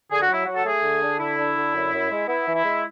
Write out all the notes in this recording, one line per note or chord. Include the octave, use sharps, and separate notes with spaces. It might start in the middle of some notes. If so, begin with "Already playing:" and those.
D3 G#4
F#4
F#3 E4
F#3 F#4
A4
A3 G#4
D3
D4
D3 E4
D4
D3
F#2
F#2
G#3
B3 E4
E3
E4
G#3